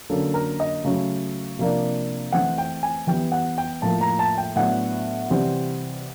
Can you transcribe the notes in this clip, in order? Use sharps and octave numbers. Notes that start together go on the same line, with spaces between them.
D3 F#3 A#3 C#4 A4
A#4
D#5
C#3 F#3 A3
C3 F3 A#3 D4
E3 A3 C4 F#5
G5
G#5
E3 G3 B3 G5
F#5
G5
A2 F3 A#3 A5
A#5
A5
G5
A2 F#3 B3 D4 F#5
C3 E3 G3 C4